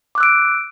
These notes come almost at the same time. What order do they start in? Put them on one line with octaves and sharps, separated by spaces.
D6 F#6 E6 D7